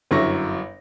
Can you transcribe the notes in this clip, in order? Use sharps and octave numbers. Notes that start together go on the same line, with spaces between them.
G1 F#2 E4 C#6 A#6